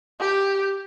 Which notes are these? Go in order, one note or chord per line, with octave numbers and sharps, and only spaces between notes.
G4